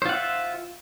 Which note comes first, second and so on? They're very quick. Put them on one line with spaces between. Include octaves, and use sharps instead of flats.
C5 F4 F#5 E5